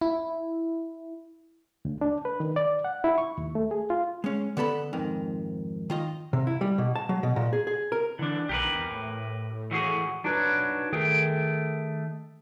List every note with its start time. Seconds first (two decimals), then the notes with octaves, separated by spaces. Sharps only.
0.01 E4
1.85 D2
2.01 D4
2.25 B4
2.40 D#3
2.56 D5
2.84 F#5
3.04 E4
3.18 C#6
3.38 D#2
3.55 A3
3.71 G#4
3.90 F4
4.24 G#3 C#4
4.57 D3 B3 A4 B5
4.93 F2 G#2 D#3
5.90 D#3 F4 D#5
6.33 C3
6.47 E4
6.61 G3
6.78 B2
6.96 A5
7.09 F#3
7.23 B2
7.36 A#2
7.53 G#4
7.67 G#4
7.92 A#4
8.19 D3 E3 D4
8.49 B1 G4 A#4 B4
8.74 E2
8.90 A2
9.71 E3 F#4 G#4
10.24 D4 D#4 F#4 B4 C#5
10.92 D#3 A3 G#4 G5